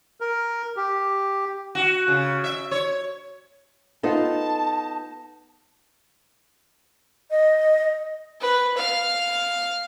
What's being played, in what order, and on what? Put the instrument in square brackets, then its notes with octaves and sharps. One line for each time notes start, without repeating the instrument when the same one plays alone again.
[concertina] A#4
G4
[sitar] F#4
C#3
E5
C#5
[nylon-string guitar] B3 F4 A4 [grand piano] D#4 [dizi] A5
[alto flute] D#5
[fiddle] B4
F5